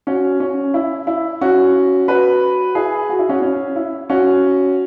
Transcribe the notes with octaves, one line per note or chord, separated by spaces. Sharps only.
C#4 F#4
C#4
E4
E4
C#4 F#4
F#4 B4
E4 G#4
F#4
E4
C#4 F#4
C#4
E4
C#4 F#4